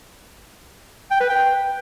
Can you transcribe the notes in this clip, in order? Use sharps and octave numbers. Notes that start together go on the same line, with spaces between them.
G5
B4
G5